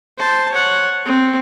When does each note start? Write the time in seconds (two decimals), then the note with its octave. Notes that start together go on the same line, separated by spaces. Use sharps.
0.18 C5 A5
0.52 C#5 F#5
1.05 C4